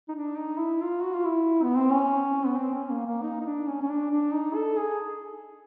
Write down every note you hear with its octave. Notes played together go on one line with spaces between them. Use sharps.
D#4
D4
D#4
E4
F4
F#4
F4
E4
B3
C4
C#4
B3
C4
C#4
A#3
A#3
D#4
D#4
D4
C#4
C#4
D4
D4
D#4
A4
G#4